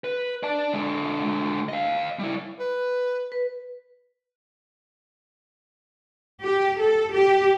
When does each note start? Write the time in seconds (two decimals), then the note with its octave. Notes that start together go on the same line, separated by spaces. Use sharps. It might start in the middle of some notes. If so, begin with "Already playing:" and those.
0.04 B4
0.43 D5 A5
0.73 D3 G#3
1.69 D#5 F5
2.19 G3 E4
2.60 B4
3.32 B4
6.43 G4
6.80 A4
7.14 G4